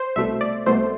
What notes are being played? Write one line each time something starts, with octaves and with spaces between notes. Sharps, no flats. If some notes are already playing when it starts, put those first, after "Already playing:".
Already playing: C5
C2 B2 A3 E5
D5
C2 B2 A3 C5